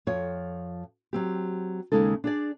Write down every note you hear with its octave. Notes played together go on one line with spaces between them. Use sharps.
F2 F3 C#5
F#3 C4 G4
D#2 A#2 C#3 G#3 D#4 A4
D4 G#4 D5